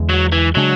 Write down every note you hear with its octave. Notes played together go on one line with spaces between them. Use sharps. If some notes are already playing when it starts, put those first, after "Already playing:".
Already playing: E2 D3 G#3
F#3
E3
C#3 F#3 G#3 D4